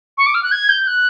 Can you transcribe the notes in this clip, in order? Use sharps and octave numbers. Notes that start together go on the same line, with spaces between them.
C#6
D6
F6
F#6
G#6
G6
F#6